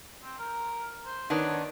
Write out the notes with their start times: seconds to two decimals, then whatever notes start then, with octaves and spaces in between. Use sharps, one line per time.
0.23 C4
0.39 A#4
1.06 C5
1.30 D#3 B3 D4 C#5